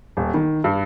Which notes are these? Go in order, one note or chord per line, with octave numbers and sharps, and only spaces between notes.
D#1
D#3
G2